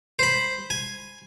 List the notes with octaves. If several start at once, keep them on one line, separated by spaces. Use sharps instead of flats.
C5 B5
G#5